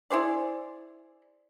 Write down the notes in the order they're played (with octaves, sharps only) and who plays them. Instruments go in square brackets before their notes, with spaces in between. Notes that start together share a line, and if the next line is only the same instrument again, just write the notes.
[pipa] E4 G#4 C5 D5